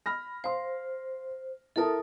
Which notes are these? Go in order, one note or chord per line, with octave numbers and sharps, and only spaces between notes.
B5 F6 A#6
C5 F5 C6
E4 A4 A#4 A5 D#6